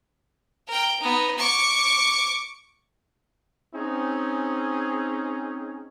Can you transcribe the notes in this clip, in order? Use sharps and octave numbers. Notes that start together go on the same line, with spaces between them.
A#4 G5
B3 D#4
C#6 D6
C4 C#4 D#4 G#4